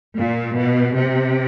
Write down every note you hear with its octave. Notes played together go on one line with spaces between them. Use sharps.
A#2
B2
C3